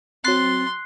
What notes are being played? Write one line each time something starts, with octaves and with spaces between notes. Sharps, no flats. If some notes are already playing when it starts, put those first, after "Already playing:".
F#3 C4 C6 F#6 A6 C7